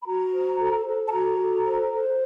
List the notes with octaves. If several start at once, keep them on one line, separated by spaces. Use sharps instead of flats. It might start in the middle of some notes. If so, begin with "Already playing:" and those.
B5
F#4 A#5
C5
A4
A4
A5
F#4 A#5
A4
C5
C5